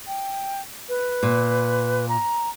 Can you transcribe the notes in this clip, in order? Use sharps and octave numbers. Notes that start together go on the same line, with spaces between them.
G5
B4
A#2
A#5